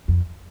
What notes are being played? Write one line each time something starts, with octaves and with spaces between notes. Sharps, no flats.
F2